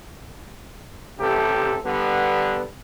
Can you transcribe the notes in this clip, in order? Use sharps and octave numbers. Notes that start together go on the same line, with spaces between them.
A1 C3 G4 A4
D3 G3 B3